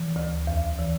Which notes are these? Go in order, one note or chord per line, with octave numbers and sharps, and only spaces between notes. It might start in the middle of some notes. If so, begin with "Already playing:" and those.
Already playing: E3
D2
E2
E3